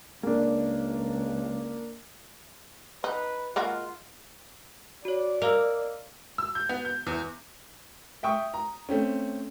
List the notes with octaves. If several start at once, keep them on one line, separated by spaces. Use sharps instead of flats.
C#2 A#3 D4
D#4 B4
G#3 A#3 F4 F#4
F#4 C#5 D5
A#4 D#5 F5 E6
E6
G6
B3
G6
E2
E5 G5 C#6 D#6
A#5
A3 C4 C#4